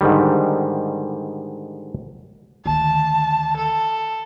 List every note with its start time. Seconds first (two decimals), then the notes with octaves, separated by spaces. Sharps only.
0.01 G#2 D3 D#3 G3
2.66 D2 D#3 A5
3.56 A4